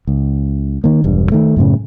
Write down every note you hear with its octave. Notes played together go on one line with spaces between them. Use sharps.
C#2
D#3 A#3
E1 G2
D#3 A3
F#2 A2 C#3